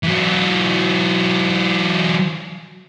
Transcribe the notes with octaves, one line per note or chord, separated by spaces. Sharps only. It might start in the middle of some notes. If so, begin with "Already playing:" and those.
E3 F#3